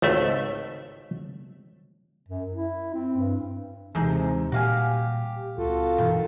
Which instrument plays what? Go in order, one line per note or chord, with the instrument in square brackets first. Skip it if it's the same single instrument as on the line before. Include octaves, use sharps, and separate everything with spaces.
[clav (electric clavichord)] G#1 C#2 A3 E5
[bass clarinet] F#2
E4
C4
G2
[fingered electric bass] D#2 E3 G#3 [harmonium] C3 [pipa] D#4 G#4 A4
[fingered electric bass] A#2 G3 [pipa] F#4 F5 G#5 [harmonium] G4
[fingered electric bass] C#2 C4 [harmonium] F4 F#4 A4
[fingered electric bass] G2 B2 E3 [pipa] D#3